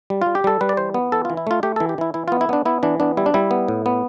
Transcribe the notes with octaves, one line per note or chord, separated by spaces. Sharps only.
G3
G3 F4
G4
G3 A4
G3 B4
D5
E3 C5
B3
E3 A4
F4
E3
E4
A3 F4
A3 G4
A4
E3
G4
E3 E4
E3 E4
F4
B3
E4
B3 D4
B3 E4
E3 D4
B3 D4
G3 E4
D4
G3 E4
B3
A2
B3